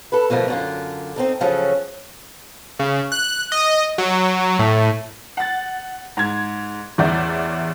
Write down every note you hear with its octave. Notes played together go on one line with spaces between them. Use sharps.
A4 B4
B2 D3 F3 A3 A#4
F#2 D3 F4
C4 D#4 A4
C#3 F3 F#3 C#4 A4
C#3
F#6
D#5
F#3
A2
F#5 A6
G#2 G#6
A1 E2 D5 E5 G6